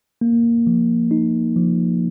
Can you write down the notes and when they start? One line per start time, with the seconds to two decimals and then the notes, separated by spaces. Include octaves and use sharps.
0.21 A#3
0.67 F3
1.11 D#4
1.56 F3